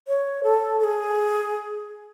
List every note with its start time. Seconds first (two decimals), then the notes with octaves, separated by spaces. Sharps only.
0.08 C#5
0.43 A4
0.79 A4
0.84 G#4